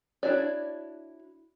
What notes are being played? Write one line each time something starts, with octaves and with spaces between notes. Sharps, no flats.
D4 E4 F#4 C#5 D5